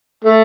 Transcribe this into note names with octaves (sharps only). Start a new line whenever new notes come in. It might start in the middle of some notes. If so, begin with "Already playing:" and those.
A3